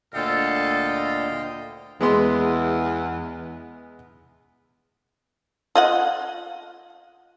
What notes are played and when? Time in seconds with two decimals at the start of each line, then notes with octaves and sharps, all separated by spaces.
0.14 D2 A#2 D3 A4 D#5 F5 G5
2.01 E2 G#3 B3 C6
5.75 F4 D#5 F#5